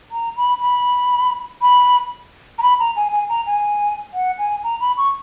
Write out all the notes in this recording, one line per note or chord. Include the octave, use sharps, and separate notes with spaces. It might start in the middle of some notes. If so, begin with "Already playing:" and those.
A#5
B5
B5
B5
A#5
B5
A#5
G#5
G#5
A#5
G#5
F#5
G#5
A#5
B5
C#6